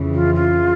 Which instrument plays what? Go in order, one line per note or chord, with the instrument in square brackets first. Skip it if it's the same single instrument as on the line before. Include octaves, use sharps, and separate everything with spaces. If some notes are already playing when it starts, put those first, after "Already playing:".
Already playing: [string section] F2 C#3 E3
[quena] F4
F4